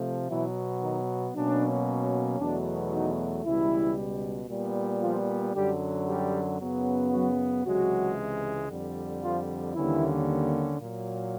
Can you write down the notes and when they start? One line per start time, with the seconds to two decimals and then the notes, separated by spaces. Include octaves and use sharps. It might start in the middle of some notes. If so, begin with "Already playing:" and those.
Already playing: C3 F3 A3
0.30 B2 E3 F#3 B3 E4
0.82 D#3 D#4
1.35 B2 F#3 A#3 C#4 D4
2.40 E2 B2 F#3 A3 D4
2.93 D#3 D#4
3.45 C#2 B2 E3 G3 E4
4.50 A#2 G3 B3
5.02 F3 F4
5.55 F#2 D3 F#3 G3 G4
6.08 G3 G4
6.60 F#2 C#3 F#3 B3
7.12 F#3 F#4
7.65 C#2 C3 E3 F#3 G#3 F#4
8.70 F2 D3 G3
9.22 F3 F4
9.74 D#2 D3 E3 G3 A#3 C#4 E4
10.80 A#2 F#3 A#3